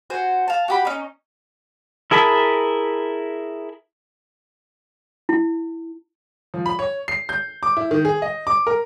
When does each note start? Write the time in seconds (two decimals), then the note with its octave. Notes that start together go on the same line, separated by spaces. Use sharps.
0.10 F#4 C5 G#5
0.48 F5 A5
0.68 F#4 G4 B5
0.85 C#4 D#4
2.11 E4 G#4 A#4 A5 B5
5.29 E4
6.54 F3
6.66 B5
6.79 C#5
7.08 C7
7.29 G6
7.63 D6
7.77 E4
7.91 D#3
8.05 G#4
8.22 D#5
8.47 D6
8.67 A#4